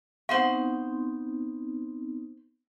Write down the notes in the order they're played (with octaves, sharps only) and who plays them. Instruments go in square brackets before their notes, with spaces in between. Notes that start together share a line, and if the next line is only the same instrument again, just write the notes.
[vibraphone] B3 C4 D#4 [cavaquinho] C5 C6 C#6 [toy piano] F5 F#5